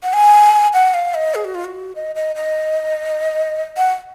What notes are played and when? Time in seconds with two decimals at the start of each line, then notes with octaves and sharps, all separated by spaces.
0.03 F#5
0.13 G#5
0.74 F#5
0.94 F5
1.14 D#5
1.35 G#4
1.45 F#4
1.55 F4
1.65 F#4
1.96 D#5
2.15 D#5
2.36 D#5
3.77 F#5